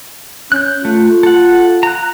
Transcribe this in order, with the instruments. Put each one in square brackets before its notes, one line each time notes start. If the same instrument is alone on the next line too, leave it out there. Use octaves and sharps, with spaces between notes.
[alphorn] C#4 [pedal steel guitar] F#6 G6
[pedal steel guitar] A3 [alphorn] F4
[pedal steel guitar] A4 F#5
A#5 F#6